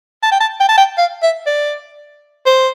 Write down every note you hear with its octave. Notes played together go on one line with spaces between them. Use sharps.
A5
G5
A5
G5
A5
G5
F5
E5
D5
C5